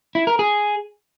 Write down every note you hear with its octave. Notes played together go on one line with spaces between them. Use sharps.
E4
A#4
G#4